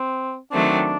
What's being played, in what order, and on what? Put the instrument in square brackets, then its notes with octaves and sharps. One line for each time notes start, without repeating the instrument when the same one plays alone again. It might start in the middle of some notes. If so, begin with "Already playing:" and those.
Already playing: [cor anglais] C4
[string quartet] D#3 F#3 A3 C4 [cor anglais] D4